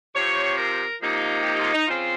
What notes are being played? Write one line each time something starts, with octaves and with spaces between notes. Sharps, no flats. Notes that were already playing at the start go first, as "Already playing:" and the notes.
C3 F3 C4 C#5
A#4
C3 F3 A#3 D#4
G4
F4
D#4
C#3 F3 C4 F4